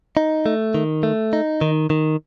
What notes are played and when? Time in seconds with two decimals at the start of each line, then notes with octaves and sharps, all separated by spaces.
0.17 D#4
0.46 A3
0.74 D#3
1.03 A3
1.33 D#4
1.61 D#3
1.90 D#3